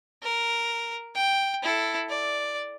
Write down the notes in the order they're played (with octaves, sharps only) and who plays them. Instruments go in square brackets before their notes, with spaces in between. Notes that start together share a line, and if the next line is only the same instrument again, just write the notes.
[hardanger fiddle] A#4
G5
E4 A4
D5